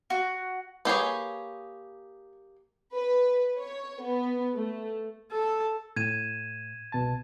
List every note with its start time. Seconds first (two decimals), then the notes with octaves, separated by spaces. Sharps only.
0.10 F#4
0.85 A#3 G4 G#4 B4 C#5
2.93 B4
3.59 C#5
4.03 B3
4.55 A3
5.32 A4
5.96 A2 G#6 D#7 E7
6.92 C2 B2 A5